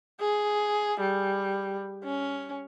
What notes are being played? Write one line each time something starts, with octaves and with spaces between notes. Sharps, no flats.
G#4
G3
C#4